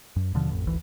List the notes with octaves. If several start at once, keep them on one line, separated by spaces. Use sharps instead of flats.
F#2
D#2 B2 D3 F3
A1 F2
D#1 G#1 D2 E3